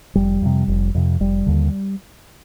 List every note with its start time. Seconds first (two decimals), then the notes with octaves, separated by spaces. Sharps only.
0.15 F1 G3
0.42 F2 C3
0.68 F1
0.95 F2 C3
1.20 F1 G3
1.46 D#2 D3